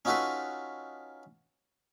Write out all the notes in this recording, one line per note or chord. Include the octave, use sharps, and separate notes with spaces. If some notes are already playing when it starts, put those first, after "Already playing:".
C#4 D#4 F4 F#4 A4 B4